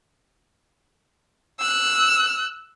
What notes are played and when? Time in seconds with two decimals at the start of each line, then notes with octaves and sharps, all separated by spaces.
1.60 E6 F#6